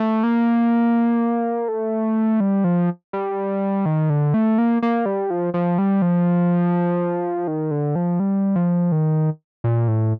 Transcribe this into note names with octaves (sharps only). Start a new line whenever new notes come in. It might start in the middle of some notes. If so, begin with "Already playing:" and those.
Already playing: A3
A#3
A3
G3
F3
G3
D#3
D3
A3
A#3
A#3
G3
F3
F3
G3
F3
D#3
D3
F3
G3
F3
D#3
A#2
A2